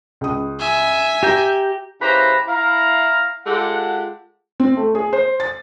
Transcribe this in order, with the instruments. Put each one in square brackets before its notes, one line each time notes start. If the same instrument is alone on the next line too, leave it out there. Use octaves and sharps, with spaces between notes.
[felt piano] C#2 D#6
[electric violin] E5 G#5
[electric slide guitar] G4 [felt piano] A#5 G6 A#6
[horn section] C#3 E4 G4 B4 C5 A#5
E4 F5 A#5
G#3 F4 G4 A4 F#5
[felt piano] C4
A3
G#4
C5
A6